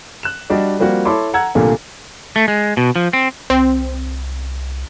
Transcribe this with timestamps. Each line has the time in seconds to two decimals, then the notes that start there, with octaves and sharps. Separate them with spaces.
0.23 F#6 E7
0.50 G3 D4 F#4 D5 D#5
0.79 F3 G3 A#3 C4 F#4
1.05 E4 A4 C#5 B5 C6 D6
1.34 F#5 A#5 E6 G#6
1.55 C2 A#2 D3 A3 A#3
2.36 A3
2.48 G#3
2.77 B2
2.96 F3
3.13 C4
3.50 C2 C4